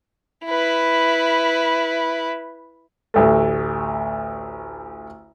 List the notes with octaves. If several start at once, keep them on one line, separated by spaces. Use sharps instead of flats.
E4 B4
A1 D2 A3